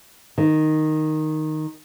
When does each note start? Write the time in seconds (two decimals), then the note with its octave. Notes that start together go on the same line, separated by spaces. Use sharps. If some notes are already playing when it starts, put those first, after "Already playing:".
0.38 D#3